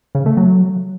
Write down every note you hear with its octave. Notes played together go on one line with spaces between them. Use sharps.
C#3
A3
F#3